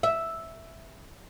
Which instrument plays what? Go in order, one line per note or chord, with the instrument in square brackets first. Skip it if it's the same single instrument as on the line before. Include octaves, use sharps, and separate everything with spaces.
[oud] E5